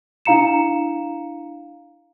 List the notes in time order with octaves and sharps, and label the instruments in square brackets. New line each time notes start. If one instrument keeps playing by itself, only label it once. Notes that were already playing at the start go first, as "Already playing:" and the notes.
[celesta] D4 E4 F5 A#5 C#7 E7